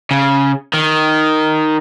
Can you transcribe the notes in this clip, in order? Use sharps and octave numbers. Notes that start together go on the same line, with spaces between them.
C#3
D#3